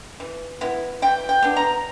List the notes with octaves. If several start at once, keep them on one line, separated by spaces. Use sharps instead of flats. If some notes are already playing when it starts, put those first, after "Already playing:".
E3
B3 E4
E3 G5
G5
B3 D4
A#5